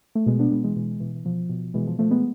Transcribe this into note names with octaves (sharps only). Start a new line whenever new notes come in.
A3
B2 G#3 B3
B3 D4
B2 G#3 B3
E3 G#3
B2 E3 G#3
B2 E3
E3
B2 F3
B2
B2 E3 G#3
F3
B2 F3 A3
G#3 B3